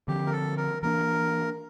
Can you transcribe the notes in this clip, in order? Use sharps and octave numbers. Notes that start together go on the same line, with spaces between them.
D3 F3 C4 G4
A#4
A4
A#4
E3 A#3 D4 A#4